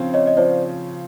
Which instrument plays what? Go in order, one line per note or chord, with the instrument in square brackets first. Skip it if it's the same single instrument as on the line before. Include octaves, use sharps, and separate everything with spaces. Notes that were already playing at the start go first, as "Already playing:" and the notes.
Already playing: [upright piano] C#3 F3 C4
[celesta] C#5 D#5
D#5
[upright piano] F3 [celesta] C5 D5